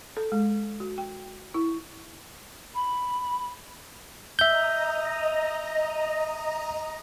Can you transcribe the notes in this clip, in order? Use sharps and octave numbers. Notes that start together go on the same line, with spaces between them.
A4
G#3
F#4
G5
E4
B5
D#5 E5 A#5 G6